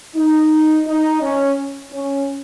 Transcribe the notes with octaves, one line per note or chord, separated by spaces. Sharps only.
D#4
D#4
C#4
C#4